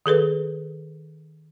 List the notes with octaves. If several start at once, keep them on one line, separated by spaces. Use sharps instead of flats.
D#3 G#4 A4 B4